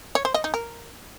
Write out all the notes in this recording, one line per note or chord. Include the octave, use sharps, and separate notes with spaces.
C#5
C5
D#5
D#4
A#4